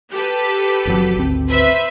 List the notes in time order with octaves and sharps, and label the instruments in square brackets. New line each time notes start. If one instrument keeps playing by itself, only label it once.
[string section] G4 A4 B4
[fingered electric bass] F#1 F2 F#3
G#1 D2 C4
[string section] B4 C5 E5